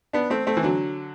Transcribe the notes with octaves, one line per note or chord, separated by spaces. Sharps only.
B3 D4
A3 C4
A3 C4
E3
D3 F#3